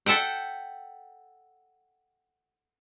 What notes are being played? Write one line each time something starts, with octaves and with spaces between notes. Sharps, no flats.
A4 E5 F#5 G5